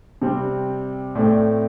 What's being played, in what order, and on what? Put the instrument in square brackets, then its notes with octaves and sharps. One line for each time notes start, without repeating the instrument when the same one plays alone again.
[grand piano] C3 G3 C4
A2 A3 C4 D5